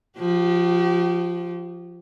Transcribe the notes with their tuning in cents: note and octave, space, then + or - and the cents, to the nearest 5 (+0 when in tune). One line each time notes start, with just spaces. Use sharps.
F3 +0 G4 -35